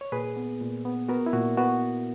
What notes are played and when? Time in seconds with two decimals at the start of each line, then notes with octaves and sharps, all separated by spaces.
0.01 C#5
0.12 A#2 G#4 B4
0.37 B3
0.61 A#2
0.85 B3
1.09 B3 F#4 A#4
1.26 E4
1.33 A#2 F#4
1.57 B3 F#4